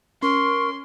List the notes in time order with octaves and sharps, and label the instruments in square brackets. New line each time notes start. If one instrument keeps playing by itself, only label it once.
[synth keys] C#4 [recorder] A#4 [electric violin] C6 [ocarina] C#6